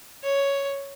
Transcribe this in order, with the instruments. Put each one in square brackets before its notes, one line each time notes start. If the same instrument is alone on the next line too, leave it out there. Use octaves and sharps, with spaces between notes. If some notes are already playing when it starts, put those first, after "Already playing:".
[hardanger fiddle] C#5